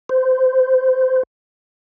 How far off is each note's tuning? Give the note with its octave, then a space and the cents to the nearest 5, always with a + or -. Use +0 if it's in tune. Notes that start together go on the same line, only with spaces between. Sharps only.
C5 -20